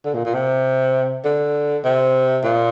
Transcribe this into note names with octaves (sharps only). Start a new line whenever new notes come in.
D3
A#2
A#2
C3
D3
C3
A#2